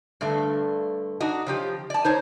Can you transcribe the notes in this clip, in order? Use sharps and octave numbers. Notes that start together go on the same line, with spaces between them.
G2 D3 A3
D4 D#4 F#4
C#3 F3 G4
D5 A5
D#4 C5 C#5